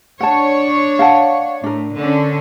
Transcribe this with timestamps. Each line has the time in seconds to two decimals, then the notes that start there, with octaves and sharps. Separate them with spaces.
0.20 D4 C#5 F#5 A5
0.99 F5 F#5 A5
1.64 A2 D4 A#4
1.98 D3 C#4